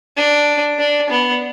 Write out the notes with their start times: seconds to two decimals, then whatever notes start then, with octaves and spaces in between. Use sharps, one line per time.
0.17 D4
0.78 D4
1.10 B3